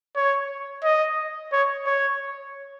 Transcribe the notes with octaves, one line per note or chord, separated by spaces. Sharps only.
C#5
D#5
C#5
C#5